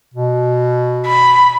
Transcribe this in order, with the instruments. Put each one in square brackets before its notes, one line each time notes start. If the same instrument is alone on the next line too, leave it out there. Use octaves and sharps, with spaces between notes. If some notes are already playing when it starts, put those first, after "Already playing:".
[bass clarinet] B2
[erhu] B5